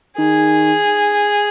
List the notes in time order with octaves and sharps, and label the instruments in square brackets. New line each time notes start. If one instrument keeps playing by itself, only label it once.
[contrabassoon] D#3 [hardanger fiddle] G#4